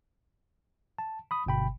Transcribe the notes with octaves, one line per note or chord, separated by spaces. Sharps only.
A5
B5 D#6
G1 B2 G5 B5